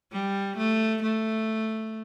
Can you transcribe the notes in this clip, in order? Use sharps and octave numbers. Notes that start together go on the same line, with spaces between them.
G3
A3
A3